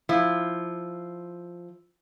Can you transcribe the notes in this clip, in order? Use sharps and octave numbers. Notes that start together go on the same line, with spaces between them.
F3 E4